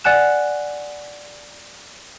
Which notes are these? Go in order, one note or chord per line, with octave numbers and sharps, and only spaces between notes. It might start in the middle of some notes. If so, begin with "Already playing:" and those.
D5 F#5 G#5 F#6 E7